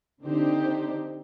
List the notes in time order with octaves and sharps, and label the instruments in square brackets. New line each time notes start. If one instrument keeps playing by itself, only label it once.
[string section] D3 C4 D4 D#4 G4 C5